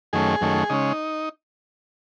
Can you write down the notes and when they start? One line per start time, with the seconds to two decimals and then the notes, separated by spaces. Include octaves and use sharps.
0.13 F#2 D#3 A3 C#4 G#4
0.41 F#2 D#3 A3 C#4
0.70 C#3 G#3 C#4 D#4